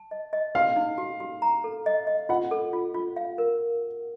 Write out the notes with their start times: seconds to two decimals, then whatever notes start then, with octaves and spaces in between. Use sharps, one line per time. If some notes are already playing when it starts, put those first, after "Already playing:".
Already playing: A5
0.11 D#5
0.33 D#5
0.55 F#4 F5
0.76 D#4
0.98 F#4
1.20 F#4
1.42 A#5
1.64 A4
1.86 D#5
2.07 D#5
2.29 F4 F#5
2.51 A4
2.73 F4
2.94 F4
3.16 F5
3.38 A#4